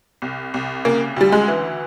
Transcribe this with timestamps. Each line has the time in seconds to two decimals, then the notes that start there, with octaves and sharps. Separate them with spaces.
0.22 C2
0.54 C2
0.85 C#3 A#3
1.16 D2 G3
1.32 G#3
1.48 E3